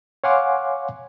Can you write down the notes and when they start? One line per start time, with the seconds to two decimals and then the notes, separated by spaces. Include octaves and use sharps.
0.24 C#5 F5 F#5 G#5 C6 D6